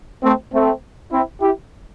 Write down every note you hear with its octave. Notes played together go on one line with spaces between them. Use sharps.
A3 C4
A3 C4
C4 E4
E4 G4